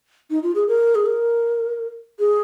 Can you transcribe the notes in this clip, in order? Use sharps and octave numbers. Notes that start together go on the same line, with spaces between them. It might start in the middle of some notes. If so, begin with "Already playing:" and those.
D#4
F4
G#4
A#4
G#4
A#4
G#4